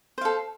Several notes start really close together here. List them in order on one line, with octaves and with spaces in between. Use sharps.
C5 F5 A4